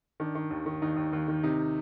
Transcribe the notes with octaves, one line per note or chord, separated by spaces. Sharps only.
D#3 D4
D#3
D#2
D#3
D#2 D#4
D#2
D#2
D#3
C3 D#4